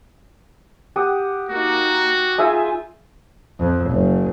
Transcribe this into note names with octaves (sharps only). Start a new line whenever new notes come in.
G4 F#5 D#6
A#3 D#4 F#4
D#4 F4 G#4 E5 G#5
F2
F#1